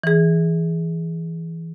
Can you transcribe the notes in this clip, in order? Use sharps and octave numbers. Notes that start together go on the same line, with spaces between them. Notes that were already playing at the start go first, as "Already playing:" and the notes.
E3 G#4